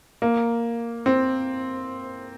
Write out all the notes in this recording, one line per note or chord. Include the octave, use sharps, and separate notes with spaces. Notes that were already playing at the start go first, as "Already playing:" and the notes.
A#3
C4